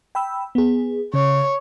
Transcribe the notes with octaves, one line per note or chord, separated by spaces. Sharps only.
G5 B5 E6
B3 G#4
C#3 C#5